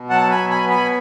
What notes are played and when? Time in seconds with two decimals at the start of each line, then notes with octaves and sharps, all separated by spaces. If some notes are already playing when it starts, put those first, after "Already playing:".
Already playing: B2
0.10 F#3 F#5 A5
0.30 G#5 B5
0.37 B2
0.50 G#5 B5
0.63 B3
0.69 G#5 B5